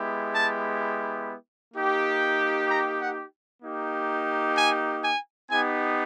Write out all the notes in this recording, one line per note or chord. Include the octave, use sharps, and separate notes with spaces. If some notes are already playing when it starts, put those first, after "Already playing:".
Already playing: G#3 B3 E4 G4
A5
A#3 D#4 G4
A#5
F#5
A#3 D#4 G4
G#5
G#5
B3 D#4 G4 G#5